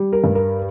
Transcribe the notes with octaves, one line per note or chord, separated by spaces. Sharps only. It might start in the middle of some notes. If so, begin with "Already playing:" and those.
Already playing: G3
A#4
G2
A#4